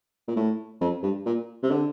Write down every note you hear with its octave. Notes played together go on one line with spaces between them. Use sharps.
A#2
A2
F2
G2
A#2
C3
D3